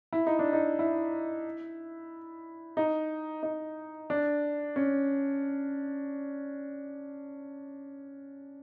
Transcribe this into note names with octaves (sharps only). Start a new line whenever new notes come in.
E4
D#4
D4
D#4
E4
D#4
D#4
D4
C#4